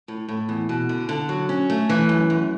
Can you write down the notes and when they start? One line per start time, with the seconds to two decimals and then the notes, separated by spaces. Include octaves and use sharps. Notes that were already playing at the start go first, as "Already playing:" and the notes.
0.08 A2
0.28 A2
0.49 E2
0.69 B2
0.89 D3
1.09 D3
1.29 F#3
1.49 C#4
1.70 A3
1.89 E3
2.09 F#2
2.30 F#2